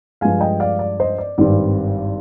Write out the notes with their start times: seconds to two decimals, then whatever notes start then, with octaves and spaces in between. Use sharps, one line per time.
0.21 G2 F3 G#3 F5 G#5
0.41 D#5 G5
0.60 D5 F5
0.79 D5
1.00 C5 D#5
1.18 D5
1.38 G#1 G2 D#3 G3 C4 D5